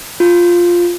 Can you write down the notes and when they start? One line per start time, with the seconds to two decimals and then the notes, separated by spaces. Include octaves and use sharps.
0.20 F4